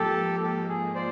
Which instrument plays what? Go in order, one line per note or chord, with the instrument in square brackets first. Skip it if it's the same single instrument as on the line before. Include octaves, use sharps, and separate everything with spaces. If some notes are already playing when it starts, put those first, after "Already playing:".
Already playing: [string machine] G#2 F3 A#3 [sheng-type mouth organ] G4 A4
[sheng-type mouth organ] G4 A4
G#4
C5 D5